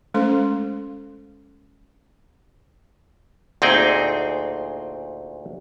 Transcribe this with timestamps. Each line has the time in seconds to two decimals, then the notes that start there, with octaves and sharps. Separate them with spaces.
0.14 G#3 A3 C#4 A4 C5 C6
3.62 D2 A#2 C4 D#4 G#4 G5